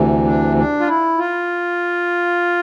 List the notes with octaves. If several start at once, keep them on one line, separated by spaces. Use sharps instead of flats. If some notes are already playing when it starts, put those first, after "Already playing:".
Already playing: D2 C3 E3
D4
D4
F4
E4
F4